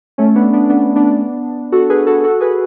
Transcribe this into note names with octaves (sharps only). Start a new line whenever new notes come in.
A3 C#4
B3 D4
B3 D4
B3 D4
B3 D4
F#4 A4
G#4 B4
F#4 A4
F#4 A4
G#4 B4